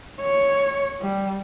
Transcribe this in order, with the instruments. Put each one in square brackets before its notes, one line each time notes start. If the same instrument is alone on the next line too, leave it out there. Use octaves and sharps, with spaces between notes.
[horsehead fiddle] C#5
G3